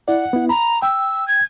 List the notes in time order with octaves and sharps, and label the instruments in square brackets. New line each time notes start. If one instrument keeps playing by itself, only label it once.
[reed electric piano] E4 D5 [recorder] F#5
[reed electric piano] B3 E4
[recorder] A#5 [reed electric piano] B5
[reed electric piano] G5 [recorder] E6
[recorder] G#6